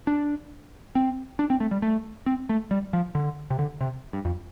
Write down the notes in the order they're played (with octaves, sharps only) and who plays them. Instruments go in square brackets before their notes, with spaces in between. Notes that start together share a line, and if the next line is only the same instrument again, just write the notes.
[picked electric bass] D4
C4
D4
C4
A3
G3
A3
C4
A3
G3
F3
D3
C3
D3
C3
G2
F2